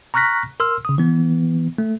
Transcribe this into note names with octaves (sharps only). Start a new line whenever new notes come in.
A#5 C#6 F6 F#6 A#6 B6
A#4 C6 E6 F6
C#3 D#6
E3 B3
A3